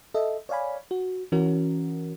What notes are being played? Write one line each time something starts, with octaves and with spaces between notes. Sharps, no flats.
A4 D#5 E5
C#5 D5 F5 G#5 B5
F#4
E3 C#4 F#4 A#4